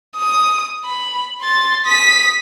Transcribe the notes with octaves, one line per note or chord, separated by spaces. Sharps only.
D#6
B5
C6 A6
D#6 B6